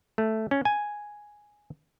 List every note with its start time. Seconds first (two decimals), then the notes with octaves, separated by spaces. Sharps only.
0.18 A3
0.51 C#4
0.65 G#5